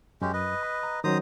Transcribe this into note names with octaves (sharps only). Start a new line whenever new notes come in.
F#2 G#3 C#4 G4
B4 D#5
B5
A#5
D#3 F#3 C#4 C5 A#5 D#6